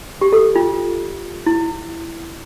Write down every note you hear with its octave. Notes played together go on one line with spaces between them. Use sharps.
G4
A4
F4
E4